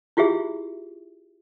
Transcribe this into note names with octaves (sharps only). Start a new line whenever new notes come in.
E4 F4 G4 G#4 E5